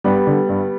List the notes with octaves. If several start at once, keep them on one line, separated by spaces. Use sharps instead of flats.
G2 G3 B3
D3
G2